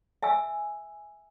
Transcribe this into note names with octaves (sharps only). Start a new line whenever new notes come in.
E5 G#5 E6